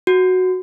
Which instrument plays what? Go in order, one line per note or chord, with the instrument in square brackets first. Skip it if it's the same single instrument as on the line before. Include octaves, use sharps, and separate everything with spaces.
[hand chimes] F#4